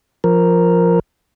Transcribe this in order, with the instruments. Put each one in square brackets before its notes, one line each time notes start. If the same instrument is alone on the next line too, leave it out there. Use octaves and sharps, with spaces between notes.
[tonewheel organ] F3 A#4